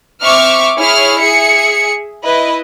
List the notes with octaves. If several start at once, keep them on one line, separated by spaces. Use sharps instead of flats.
C4 E5 C#6 D6 F6
E4 G#4 C#5 F6
G#4 E5 C#7
E4 B4 D#5